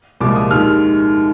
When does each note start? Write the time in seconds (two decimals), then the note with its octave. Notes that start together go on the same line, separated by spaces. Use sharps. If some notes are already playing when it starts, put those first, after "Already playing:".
0.20 C2 A#2 F3 G#3 D6
0.35 D#6
0.50 D#2 D#3 G#3 F6